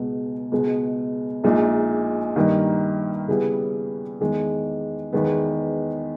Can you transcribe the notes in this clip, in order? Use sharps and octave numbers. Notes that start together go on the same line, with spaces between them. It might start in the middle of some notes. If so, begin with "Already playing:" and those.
Already playing: C#2 B2 G#3
C#2 B2 G#3
A#1 A#2 G#3 D#4
G2 D#3 A#3 D#4
C#3 G3 B3 E4 G#4
E2 D#3 G#3
E2 D#3 G#3 B3